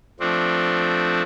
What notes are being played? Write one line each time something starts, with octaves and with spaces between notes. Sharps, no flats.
F3 A3 C4 D4